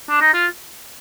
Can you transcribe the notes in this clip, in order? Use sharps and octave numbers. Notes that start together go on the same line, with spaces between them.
D4
D#4
F4